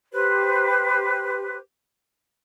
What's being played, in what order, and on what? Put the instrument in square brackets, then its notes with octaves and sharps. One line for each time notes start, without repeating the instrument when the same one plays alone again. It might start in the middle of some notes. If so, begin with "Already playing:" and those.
[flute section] G4 B4 C5